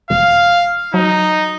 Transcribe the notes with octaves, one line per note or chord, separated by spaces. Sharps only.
E1 F5
F#3 D#4